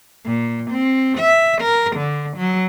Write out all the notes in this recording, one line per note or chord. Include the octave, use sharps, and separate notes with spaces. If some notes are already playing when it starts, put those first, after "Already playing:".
A#2
C4
E5
A#4
D3
F#3